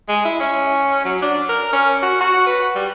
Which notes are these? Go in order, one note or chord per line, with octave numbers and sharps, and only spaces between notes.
G#3
E4
C#4
F#3
D4
A#4
C#4
F#4
F#4
B4
G3